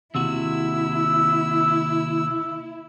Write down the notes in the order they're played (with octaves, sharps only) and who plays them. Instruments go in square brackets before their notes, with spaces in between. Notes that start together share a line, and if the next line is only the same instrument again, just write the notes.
[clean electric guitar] D#2 C3 F#4 [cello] E4 [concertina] E6